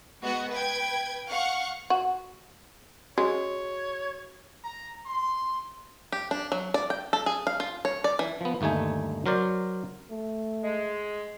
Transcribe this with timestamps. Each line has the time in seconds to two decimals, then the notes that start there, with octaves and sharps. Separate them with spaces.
0.22 G#3 B3 F#4 D#5 F#5
0.52 B4 G5 G#6
1.29 F5 F#5 C#6 F#6
1.90 F#4
3.18 G#3 F#4 C#5
4.65 A#5
5.07 C6
6.12 G4
6.31 D4
6.52 F#3
6.74 D5
6.90 G5
7.13 A4
7.26 G#4
7.47 F5
7.60 F4
7.85 C#5
8.04 D5
8.19 E3
8.41 F3 B3
8.61 G1 D#2 A3 D#4 G#5
9.26 F#3 A#4 C5 D5
10.10 A3
10.64 G#3